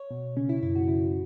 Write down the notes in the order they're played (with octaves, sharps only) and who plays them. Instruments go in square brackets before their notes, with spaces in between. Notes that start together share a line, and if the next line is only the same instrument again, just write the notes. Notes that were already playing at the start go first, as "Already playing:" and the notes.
Already playing: [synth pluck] C#5
B2
C#3 C#4
E4
F#2 E4
F#4
C#3 E4